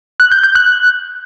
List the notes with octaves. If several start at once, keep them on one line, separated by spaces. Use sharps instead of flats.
F#6
G6
G6
F#6